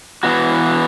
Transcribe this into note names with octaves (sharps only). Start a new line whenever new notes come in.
E3 B3 F#4